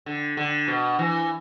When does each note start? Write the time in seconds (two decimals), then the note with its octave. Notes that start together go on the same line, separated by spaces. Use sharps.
0.06 D3
0.37 D3
0.68 B2
0.99 E3